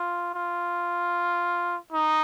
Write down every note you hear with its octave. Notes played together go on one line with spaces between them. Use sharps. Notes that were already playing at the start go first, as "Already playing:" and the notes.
Already playing: F4
F4
D#4